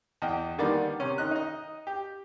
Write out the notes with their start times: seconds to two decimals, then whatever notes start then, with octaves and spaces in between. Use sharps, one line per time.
0.22 E2 D#5 G5
0.58 D3 D#3 G3 A#3 B3 D5
1.00 C3 C#4
1.18 D#3 D#5 F#6
1.31 D#4 D#5
1.87 G4